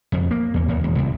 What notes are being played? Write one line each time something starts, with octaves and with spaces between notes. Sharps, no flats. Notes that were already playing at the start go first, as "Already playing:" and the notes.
F2
A#3
E2
D#2
E1
C2